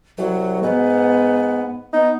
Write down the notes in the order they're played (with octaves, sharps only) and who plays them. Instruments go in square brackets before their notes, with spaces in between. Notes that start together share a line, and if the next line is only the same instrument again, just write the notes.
[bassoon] C2 [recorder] F#3
[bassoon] G#2 [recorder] B3
[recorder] B3 [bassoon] D#4